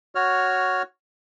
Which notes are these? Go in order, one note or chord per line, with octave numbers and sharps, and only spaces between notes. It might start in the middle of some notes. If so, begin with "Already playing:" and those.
F#4 C#5 F6